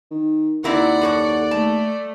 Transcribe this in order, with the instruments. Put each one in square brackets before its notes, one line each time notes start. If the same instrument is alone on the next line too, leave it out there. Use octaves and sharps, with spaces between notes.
[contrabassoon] D#3
[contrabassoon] D#2 [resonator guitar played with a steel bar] C4 E4 A#4 [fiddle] D5 [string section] F#5
[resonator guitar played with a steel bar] F#2 A4 C#5
[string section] A3 [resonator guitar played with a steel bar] A5